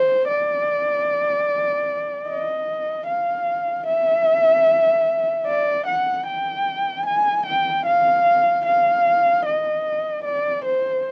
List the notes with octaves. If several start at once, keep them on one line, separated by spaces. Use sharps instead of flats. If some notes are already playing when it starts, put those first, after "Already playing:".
Already playing: C5
D5
D#5
F5
E5
D5
F#5
G5
G#5
G5
F5
F5
D#5
D5
C5